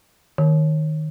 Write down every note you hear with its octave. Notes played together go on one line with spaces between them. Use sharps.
D#3